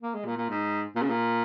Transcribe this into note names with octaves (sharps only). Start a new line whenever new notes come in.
A#3
G#3
A#2
A#2
G#2
A#2
C#3
A#2